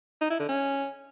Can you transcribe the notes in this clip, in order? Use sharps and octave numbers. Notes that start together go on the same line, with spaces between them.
D#4
E4
D3
C#4